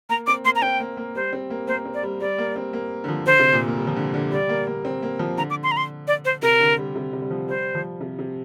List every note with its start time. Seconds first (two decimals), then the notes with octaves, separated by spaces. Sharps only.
0.09 A#3 A#5
0.27 C4 D6
0.45 A#3 C6
0.56 A#5
0.62 C4 G5
0.80 A#3
0.97 A#3
1.15 G3 C5
1.33 C4
1.50 A#3
1.68 A#3 C5
1.85 C4
1.94 D5
2.03 G3
2.21 G3 D5
2.38 A#3
2.56 C4
2.73 A#3
3.04 D3
3.08 F3
3.26 D3 C5
3.39 C3
3.53 A#2
3.68 A#3
3.77 G3
3.87 F3
3.96 D3
4.14 D3
4.31 G3 D5
4.49 A#3
4.67 A#3
4.85 C4
5.02 A#3
5.19 F3
5.37 D3 A#5
5.50 D6
5.63 C6
5.71 A#5
5.77 C6
6.08 D5
6.25 C5
6.42 C3 A#4
6.60 D3
6.78 G3
6.95 C3
7.13 C3
7.22 G3
7.31 F3
7.48 G3 C5
7.75 F3
8.01 C3
8.19 C3